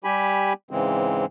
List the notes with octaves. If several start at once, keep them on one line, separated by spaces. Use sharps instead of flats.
G3 G4 G#5 B5
G#2 C#3 E3 G#3 C4